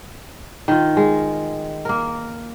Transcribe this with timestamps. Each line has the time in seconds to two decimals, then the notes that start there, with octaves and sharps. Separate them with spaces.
0.68 D#3 F4
0.97 G#3
1.85 A#3 A#4